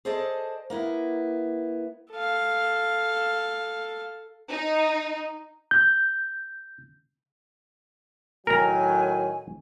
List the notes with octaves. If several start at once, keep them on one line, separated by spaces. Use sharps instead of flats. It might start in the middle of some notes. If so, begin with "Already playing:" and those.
G#4 A4 C5 D5 D#5 A5
A#3 B3 E4
A4 F5
D#4
G6
A2 D#3 F#3 A#4 G#5 A#5